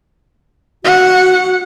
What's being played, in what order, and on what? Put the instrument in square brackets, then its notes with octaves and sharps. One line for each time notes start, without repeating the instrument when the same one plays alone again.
[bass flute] F#4 [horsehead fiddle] F#5